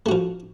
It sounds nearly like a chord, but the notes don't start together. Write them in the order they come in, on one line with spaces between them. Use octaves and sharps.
A3 F#4 F3